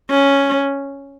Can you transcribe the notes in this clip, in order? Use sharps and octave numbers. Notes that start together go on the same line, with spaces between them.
C#4